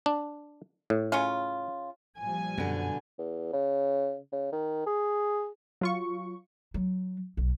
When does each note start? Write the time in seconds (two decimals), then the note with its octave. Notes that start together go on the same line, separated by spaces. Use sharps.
0.06 D4
0.90 A2
1.12 C#3 C#4 F4
2.19 A#2 F3 G3 G#5
2.58 F#2 B2 D3
3.19 E2
3.52 C#3
4.32 C#3
4.52 D#3
4.86 G#4
5.81 F#3 F4 C#6
6.74 F#3
7.37 B1